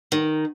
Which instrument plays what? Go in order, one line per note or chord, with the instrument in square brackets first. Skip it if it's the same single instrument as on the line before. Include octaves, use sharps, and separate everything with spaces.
[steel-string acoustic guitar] D#3